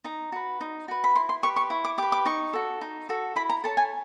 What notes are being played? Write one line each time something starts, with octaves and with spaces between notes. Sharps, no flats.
D#4 A#5
F#4 B4
D#4
F#4 B4
B5
E4 C6
C6
G4 B4 C#6
C#6
E4
D6
G4 B4 D6
D6
D#4 C#6
F#4 A4
D#4
F#4 A4
E4 B5
A#5
A4 C#5 A5
G#5